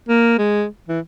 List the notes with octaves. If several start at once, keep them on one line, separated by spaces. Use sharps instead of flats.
A#3
G#3
E3